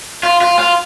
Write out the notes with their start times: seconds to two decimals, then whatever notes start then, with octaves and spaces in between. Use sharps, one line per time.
0.23 F4
0.41 F4
0.59 F4